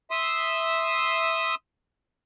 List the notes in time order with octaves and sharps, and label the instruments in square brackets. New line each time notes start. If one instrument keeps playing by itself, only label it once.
[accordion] E5 C6 D#6